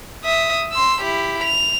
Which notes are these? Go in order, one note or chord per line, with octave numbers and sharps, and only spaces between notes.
E5 D#6
C6 E6
E4 G4
F7